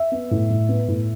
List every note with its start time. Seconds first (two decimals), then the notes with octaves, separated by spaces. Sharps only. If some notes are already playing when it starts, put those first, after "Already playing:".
Already playing: E5
0.12 B3
0.31 A2
0.50 A2
0.69 B3
0.88 A2